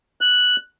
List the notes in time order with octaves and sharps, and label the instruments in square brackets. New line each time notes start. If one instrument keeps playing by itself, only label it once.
[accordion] F#6